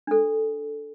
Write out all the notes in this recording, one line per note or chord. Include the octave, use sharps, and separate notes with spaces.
D4 A4